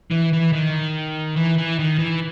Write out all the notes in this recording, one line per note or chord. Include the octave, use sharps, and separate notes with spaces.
E3
E3
D#3
E3
E3
D#3
E3